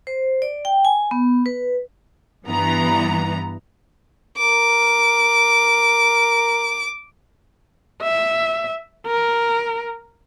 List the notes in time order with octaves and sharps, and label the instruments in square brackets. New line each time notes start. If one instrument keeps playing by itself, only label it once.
[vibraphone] C5
D5
G5
G#5
B3
B4
[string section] G2 E3 B3 A#5
[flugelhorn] A#4 [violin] D6
[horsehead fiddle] E5
A#4